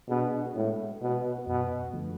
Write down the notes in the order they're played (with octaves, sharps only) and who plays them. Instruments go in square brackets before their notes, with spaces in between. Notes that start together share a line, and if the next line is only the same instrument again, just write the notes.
[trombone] B2 [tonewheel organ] B3 D4 G#4
[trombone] A2 [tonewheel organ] G#3
[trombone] B2 [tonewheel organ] B3 F#4 B4
[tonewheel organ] F#2 [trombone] B2
[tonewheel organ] D3 F3 A3